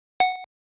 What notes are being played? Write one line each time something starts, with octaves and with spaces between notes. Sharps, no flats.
F#5